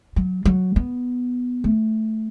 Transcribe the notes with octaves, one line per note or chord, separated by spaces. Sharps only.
F#3
F#3
B3
A3